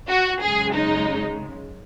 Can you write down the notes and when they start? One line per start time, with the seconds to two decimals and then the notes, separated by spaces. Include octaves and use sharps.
0.09 F#4
0.42 F#2 C#3 G#3 G#4
0.74 D#4